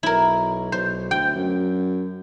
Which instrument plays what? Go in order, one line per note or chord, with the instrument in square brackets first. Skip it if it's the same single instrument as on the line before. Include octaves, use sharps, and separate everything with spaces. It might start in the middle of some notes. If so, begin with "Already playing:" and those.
[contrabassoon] B1 [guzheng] E4 A#4
[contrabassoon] B1 [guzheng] C5
[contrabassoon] D2 [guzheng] G5
[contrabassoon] F#2